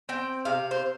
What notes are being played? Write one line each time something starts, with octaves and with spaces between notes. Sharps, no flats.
C4 G5
C3 F5
C5